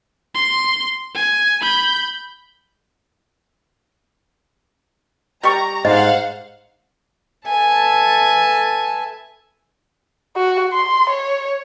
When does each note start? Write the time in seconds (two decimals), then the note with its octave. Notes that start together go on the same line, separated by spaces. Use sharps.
0.35 C6
1.15 G#5
1.62 B5 G6
5.43 G3 G4 A#5 C#6
5.85 G#2 C5 D#5 F5 F#5
7.48 A4 B4 E5 G#5 A5
10.36 F#4
10.73 C6
11.10 C#5